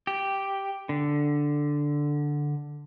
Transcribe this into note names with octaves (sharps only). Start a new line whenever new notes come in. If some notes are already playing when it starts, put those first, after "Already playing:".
G4
D3